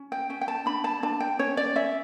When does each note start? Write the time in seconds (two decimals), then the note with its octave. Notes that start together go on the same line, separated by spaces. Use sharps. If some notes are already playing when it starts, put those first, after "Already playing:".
Already playing: C#4
0.12 G5
0.30 C#4 G5
0.41 G5
0.48 A5
0.66 D4 B5
0.84 A5
1.03 D4 A5
1.20 G5
1.39 C#4 C#5
1.57 D5
1.75 C#4 E5